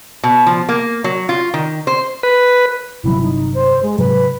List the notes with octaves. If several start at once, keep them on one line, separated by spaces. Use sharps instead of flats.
B2
F3
A#3
F#3
F4
D#3
C5
B4
G1 C3 F#3 E4
D#4
C5
G#3
G#2 C3 F#3 B4